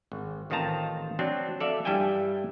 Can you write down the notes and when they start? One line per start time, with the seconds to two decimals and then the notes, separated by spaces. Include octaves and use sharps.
0.12 G#1
0.50 A1 D#3 C4 F4 A5 A#5
1.19 F#3 C4 D4
1.60 A4 D5 E5 F5
1.85 G2 G3 E4 E5 G5 G#5